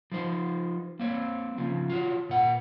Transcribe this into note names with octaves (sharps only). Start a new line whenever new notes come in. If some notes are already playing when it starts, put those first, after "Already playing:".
F3 D#4 C5
A#3 C4 C#5
C#3 F3
F4 F#4 C#5
A#2 F#5